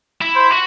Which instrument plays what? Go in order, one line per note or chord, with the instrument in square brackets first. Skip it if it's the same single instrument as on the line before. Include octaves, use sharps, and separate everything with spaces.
[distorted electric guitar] E4
[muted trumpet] C5
[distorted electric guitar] F#4